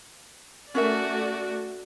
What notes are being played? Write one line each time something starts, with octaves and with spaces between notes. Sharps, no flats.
A3 C#4 F#4 A#4 D5 E5